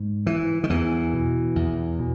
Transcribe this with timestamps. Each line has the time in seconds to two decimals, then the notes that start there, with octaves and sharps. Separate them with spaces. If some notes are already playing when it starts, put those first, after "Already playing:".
Already playing: G#2
0.26 E3
0.64 D#3
0.69 E2 E3
1.13 B2
1.56 E2
1.99 B2